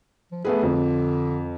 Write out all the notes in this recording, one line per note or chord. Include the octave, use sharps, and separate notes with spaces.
F3
A3 B3 G#4 B4
F2 D3